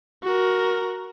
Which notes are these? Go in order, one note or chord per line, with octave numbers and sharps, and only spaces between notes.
F#4 A#4